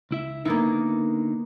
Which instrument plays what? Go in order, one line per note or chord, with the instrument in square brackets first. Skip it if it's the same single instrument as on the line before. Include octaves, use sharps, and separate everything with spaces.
[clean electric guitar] C#2 E4 E5
[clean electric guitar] D3 D#4 A#4 [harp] A#3 B3 E4